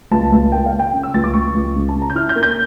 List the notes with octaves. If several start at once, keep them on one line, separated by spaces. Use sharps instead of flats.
C#2 A5
C#2
A#3 G5
F5
A#3
G5
C#3
E6
C#2 A6
D6
C#2 C#6
C#2
C#3
A5
C#3
A#5
G6
E4 F6
G6
A#3
G6